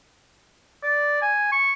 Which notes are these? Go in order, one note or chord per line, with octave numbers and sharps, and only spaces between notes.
D5
G#5
C#6